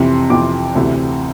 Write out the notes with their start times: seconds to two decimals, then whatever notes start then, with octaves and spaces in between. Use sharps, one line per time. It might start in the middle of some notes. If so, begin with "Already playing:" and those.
Already playing: F2 C3 E3 C6
0.30 F2 C3 E3 D6
0.75 D2 C3 E3